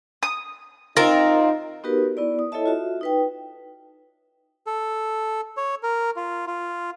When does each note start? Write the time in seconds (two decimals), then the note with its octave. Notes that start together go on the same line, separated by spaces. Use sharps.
0.23 D#6
0.97 C4 D#4 F4 A#4
1.84 B3 D#4 F#4 G4 A#4 B4
2.17 B3 E4 D5
2.39 D#6
2.52 E4 A4 C#5 D#5 E5 A5
2.66 F4 F#4 E5
3.01 D#4 B4 G5
4.67 A4
5.57 C#5
5.83 A#4
6.16 F4
6.47 F4